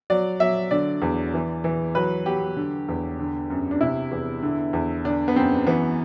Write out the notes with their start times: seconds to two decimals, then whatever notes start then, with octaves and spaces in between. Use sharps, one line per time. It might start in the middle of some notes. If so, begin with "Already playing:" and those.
0.10 F#3 D5
0.40 F#3 E5
0.71 D3 D5
1.02 E2
1.34 E3
1.64 E3
1.95 F#3 B4
2.26 F#3 G4
2.57 D3
2.89 E2
3.19 D3
3.50 F#2
3.71 D4
3.81 C3 E4
4.11 E2
4.42 D3
4.73 E2
5.04 D3 D4
5.28 B3
5.36 F#2 C4
5.67 E3 B3